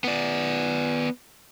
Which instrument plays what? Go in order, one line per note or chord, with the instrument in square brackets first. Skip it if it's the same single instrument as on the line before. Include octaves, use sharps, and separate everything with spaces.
[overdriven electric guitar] B3 D5